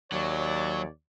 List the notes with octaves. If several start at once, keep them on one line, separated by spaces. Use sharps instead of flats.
D#2 F#3 C#5 D5